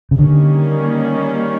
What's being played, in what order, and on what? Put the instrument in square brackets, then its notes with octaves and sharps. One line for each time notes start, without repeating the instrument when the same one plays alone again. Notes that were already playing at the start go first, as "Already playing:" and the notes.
[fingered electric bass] C#3
[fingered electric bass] D3 [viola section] D#3 G3 A#3 C#4